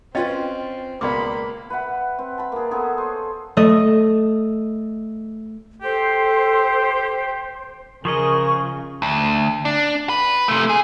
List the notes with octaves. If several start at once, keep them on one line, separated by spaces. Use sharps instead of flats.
C4 C#4 F4 B4 C#5 D#5 G5
C#2 B2 A#3 B3 D5 B5 C6 D6
B4 E5 F#5 B5
C4 B4
A5 B5
A#3 G#4
B3 G#4 A4 C5
C5 C#5
A3 D#5
G4 A4 C5
C#3 F3 G#4 A#4 D#5 C#6
D2
D4
B4
C3 A3
G#4